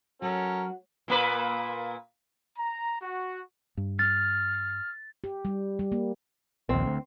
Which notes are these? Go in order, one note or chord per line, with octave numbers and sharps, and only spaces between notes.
F#3 C#4 F#4 A4 A#4
A#2 A#3 B4
A#5
F#4
G2
F6 A6
G4
G3
G3
A#3
A#1 D#2 C4
D2